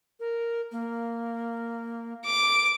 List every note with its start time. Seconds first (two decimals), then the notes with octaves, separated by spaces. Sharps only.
0.20 A#4
0.72 A#3
2.26 D6